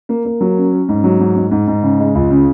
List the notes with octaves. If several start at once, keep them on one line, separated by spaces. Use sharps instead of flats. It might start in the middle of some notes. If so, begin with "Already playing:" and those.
A#3
A#3
F#3
C#4
C#4
G#2
F#3
G#2
G#2
G#2
G#2
C#3
G#3
C#2
C#3